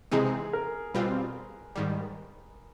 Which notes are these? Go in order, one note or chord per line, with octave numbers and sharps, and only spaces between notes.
C3 E3 G#3 C4 D#4 G#4
A#4
B2 G3 C4 F4 B4
G#2 D#3 G3